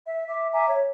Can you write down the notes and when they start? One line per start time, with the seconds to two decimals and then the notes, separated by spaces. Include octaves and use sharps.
0.06 E5
0.27 E5 D6
0.53 E5 G#5 A#5 D6
0.68 C#5